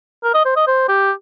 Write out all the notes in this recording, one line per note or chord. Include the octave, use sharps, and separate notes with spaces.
A#4
D#5
C5
D#5
C5
G4